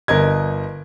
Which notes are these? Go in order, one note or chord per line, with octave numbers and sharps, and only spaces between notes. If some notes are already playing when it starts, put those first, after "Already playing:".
G1 A#4 D#5 G#6